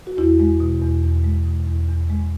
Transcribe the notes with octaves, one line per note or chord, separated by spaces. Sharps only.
F#4
E2 E4
G#3
B2
E2
E2
G#3
B2
E2
E2
G#3